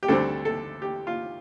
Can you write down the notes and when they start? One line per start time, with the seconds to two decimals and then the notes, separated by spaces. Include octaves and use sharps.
0.03 G4
0.08 D2 D3 G3 C4 A4
0.45 A4
0.82 G4
1.07 F4